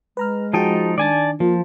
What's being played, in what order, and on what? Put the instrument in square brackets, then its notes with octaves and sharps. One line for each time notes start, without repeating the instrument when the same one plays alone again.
[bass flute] G#3 [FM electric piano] B4 A#5 F6
[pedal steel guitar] F3 D#4 G5 [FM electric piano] F#4 G#4 A5
[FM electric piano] D#3 D4 [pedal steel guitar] D5 G#5 A5
[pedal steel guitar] F3 [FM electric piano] A#3 [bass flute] F4